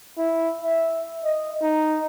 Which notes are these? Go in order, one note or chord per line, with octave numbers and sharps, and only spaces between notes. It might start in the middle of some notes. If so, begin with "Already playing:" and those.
E4
E5
D#5
D#4